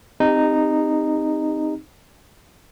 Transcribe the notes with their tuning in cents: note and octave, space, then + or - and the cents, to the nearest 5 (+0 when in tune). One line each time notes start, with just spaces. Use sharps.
C4 +0 D#4 -10 G4 +30